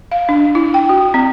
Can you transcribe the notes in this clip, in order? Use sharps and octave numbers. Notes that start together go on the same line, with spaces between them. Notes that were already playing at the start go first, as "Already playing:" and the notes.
F5
D4
E4
G5
F#4
C4